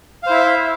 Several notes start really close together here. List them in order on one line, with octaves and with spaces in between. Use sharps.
F5 C5 E4 E5